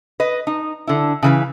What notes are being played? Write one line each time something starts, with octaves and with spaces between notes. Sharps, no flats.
B4 D#5
D#4
D3 E4
C#3 E3 B4